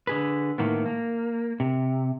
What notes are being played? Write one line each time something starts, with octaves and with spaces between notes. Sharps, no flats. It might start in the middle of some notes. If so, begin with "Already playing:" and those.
D3 G#4 B4
A2 D#3 A#3 B3
A#3
C3